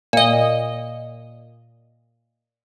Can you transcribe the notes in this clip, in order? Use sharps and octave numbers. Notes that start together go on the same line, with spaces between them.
A#2 D#5